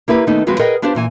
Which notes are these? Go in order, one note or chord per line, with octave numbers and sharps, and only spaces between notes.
A#3 E4 G4 B4
D#3 A3 B3 D#4
D#2 F3 G#3 C4 F#4 B4
G#4 A#4 B4 D#5 F#5 G5
B3 D4 F4 G4 C5
A#2 E3 G#5